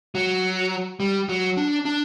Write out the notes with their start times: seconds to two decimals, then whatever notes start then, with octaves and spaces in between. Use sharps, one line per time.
0.15 F#3
1.00 G3
1.29 F#3
1.57 D4
1.85 D4